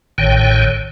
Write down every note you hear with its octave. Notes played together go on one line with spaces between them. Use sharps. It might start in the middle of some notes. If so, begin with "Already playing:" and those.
A1 A2 D3 D#3 C#5 G5